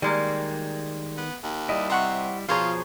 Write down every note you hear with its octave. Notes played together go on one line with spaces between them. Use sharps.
D#3 G3 G#3 A#3
B3
D#2
G3 E4 D#5
C3 C5 F#5 C#6
B2 F3 F4 G#4 C5 C#5 A#5